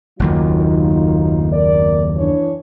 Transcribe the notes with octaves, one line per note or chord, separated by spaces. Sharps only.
F#1 D#2 D#3 F#3 D#4 F4
A#4 D5
E3 D4 C#5